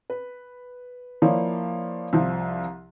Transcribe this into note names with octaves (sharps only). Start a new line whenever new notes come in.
B4
F3 A#3 E4 C#5 D5
C2 F3